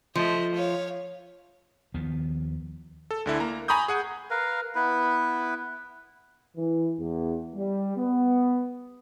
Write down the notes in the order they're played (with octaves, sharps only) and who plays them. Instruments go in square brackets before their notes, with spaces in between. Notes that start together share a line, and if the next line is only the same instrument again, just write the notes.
[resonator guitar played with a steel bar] F3 [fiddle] A3 D#5
[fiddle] C#5 F5
[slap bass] D#2 D#3 F3 B3
[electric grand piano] A4
D2 D3 E4
A#3 A#5
G#5 A#5 B5 C#6 D#6 G6
G#4 F#5 G#5
[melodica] A#4 B4 F5
B3 E4 B4
[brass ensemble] E3
E2
G3
B3